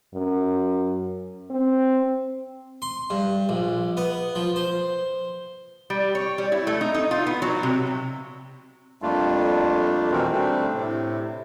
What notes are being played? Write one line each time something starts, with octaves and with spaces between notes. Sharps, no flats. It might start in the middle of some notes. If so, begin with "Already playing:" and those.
F#2
C4
C6
G2
A#1
B3
F3
C5
G3
C#5
G3
E4
A3
D#4
D#4
F4
B3
F#3
C3
F2 G3 A3 A#3 D4 F4
B2 D#3 E3 C4 F#4 A#4
G3 A3 C4 D4
A2 C3